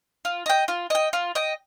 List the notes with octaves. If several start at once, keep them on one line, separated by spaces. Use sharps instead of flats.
F4
D#5 G5
F4
D#5 G5
F4
D#5 G5